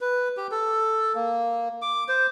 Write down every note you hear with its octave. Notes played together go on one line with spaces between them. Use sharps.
B4
G4
A4
A#3
D6
C5